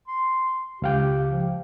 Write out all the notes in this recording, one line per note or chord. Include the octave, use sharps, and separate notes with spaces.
C6
C#2 G4 F5 G5
F3